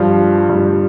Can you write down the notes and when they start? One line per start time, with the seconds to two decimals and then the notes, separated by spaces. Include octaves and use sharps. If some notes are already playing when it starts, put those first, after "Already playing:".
Already playing: G2 F3 G3 F4
0.49 G2
0.55 G3